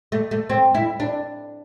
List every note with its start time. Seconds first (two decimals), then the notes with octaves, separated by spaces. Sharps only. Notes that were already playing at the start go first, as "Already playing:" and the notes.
0.12 A3
0.31 A3
0.50 C4
0.74 E4
1.00 D4